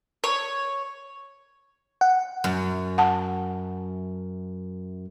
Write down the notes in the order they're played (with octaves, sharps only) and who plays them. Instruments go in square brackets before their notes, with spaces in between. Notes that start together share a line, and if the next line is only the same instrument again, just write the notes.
[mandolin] C#5
[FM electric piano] F#5
[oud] F#2
[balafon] F#5 A5